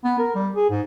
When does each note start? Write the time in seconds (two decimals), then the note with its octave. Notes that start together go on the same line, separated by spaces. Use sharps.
0.04 B3
0.18 A#4
0.35 G3
0.56 G#4
0.70 G#2